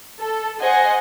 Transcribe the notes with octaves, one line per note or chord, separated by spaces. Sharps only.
A4
G#4 C5 D#5 F#5 G#5